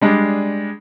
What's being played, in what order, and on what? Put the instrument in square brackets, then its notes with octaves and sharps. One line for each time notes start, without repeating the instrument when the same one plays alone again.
[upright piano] G3 G#3 D4